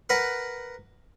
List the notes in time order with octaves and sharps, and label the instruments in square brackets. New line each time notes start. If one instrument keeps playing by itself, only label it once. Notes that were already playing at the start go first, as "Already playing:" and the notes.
[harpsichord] A#4 B4 F#5